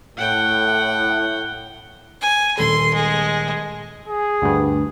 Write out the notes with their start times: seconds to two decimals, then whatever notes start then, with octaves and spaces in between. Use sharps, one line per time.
0.18 A2 F#5 G5
2.21 G#5
2.58 D#1 A4 C6
2.94 G#3
4.08 G#4
4.42 D2 G2